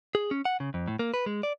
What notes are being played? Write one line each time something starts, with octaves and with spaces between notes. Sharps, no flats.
G#4
C#4
F#5
C#3
F2
A2
A#3
B4
G#3
D5